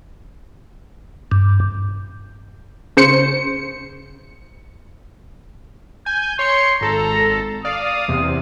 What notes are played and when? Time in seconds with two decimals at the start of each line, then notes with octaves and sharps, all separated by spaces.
1.32 G2
2.97 C#3 C5 C#7
6.06 G#5 G6
6.39 C#5 C6 C#7
6.81 G#1 A4 A#5
7.65 D5 F5 D#6
8.08 E2 C3